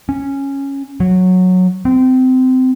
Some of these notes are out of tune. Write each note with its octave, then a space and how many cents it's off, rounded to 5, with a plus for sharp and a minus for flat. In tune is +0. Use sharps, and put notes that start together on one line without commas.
C#4 -5
F#3 -10
C4 -25